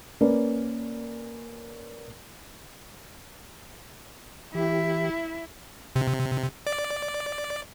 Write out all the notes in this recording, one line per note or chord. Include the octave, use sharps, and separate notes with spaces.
A#3 C#4 A#4 B4 D5
E3 E4 G4
C3
D5